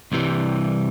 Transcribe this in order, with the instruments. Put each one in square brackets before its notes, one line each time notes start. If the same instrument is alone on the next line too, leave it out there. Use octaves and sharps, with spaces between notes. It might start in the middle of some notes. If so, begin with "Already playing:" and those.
[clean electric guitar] C2 C3 E3 G3